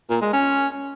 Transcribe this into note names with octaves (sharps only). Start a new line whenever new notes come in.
A#2
G#3
C#4